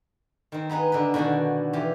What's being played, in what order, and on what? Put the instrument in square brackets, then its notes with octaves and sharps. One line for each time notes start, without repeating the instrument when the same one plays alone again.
[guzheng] D#3 C4
B3 D#4 G#4 B4
D3 B4
B2 D3 D#3 D4 F#4
E3 F4 G4